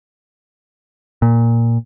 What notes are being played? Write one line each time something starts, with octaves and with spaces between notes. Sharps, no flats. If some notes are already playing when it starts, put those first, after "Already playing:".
A#2